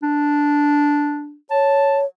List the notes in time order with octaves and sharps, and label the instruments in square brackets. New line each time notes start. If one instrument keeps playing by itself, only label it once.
[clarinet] D4
[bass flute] C#5 [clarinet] A5